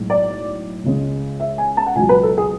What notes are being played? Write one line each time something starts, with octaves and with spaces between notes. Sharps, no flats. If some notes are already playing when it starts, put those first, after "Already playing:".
Already playing: B1 A2 G#3
D5
C#2 C#3 G#3
E5
G#5
A5
F#5
C#2 B2 F#3 G#5
B4
A4
G#4